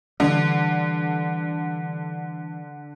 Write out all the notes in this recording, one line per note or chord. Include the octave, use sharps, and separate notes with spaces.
D3 E3 G3